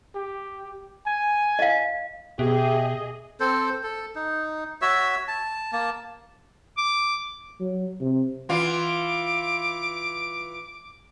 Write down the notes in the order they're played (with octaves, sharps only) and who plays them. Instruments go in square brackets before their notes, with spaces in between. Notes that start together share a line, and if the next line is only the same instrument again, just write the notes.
[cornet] G4
G#5
[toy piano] D#5 F5
[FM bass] B2 [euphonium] G4 [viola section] G#4 D#5 [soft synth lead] E5
[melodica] C4 A4 C5
A4
D#4
F#4 C#5 E5 E6
A5
A#3 A5
[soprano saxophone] D6
[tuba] F#3
C3
[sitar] E3 F4 [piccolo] D6